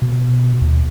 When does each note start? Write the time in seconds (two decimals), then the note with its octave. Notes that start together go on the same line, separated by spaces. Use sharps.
0.02 B2
0.61 D#2